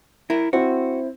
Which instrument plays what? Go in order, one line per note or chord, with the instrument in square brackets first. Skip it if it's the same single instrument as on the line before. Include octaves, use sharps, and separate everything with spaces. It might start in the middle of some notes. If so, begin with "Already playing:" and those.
[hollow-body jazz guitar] E4 A#4
[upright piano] C4 E4 [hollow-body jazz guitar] F#4